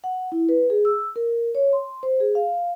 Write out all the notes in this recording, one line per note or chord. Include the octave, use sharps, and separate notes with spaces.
F#5
E4
B4
G#4
E6
A#4
C#5
C6
C5
G#4
F5